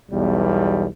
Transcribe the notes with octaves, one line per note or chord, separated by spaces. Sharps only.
B1 E2 G3